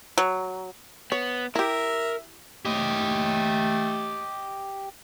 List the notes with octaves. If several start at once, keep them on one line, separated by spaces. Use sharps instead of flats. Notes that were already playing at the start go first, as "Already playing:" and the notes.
F#3
B3 C#5
E4 G4 A#4 E5
A3 G4 D#5